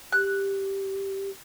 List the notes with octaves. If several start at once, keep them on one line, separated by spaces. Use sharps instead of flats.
G4 F#6